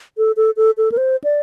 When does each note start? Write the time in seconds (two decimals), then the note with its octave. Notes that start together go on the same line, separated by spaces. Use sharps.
0.18 A4
0.37 A4
0.57 A4
0.77 A4
0.92 A#4
0.97 C5
1.24 D5